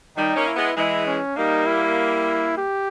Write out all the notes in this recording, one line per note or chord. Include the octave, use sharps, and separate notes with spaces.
D#3 G3 D#4
A#3 C#4
E4
G#3 B3
E3 G#3 E4
C#4
G3 A#3 D#4
E4
G4